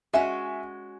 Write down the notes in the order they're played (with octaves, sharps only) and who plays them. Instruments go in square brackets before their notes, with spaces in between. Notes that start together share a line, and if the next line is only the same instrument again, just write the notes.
[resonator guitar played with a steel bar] G#3 C#4 F#4 [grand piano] E5 G#5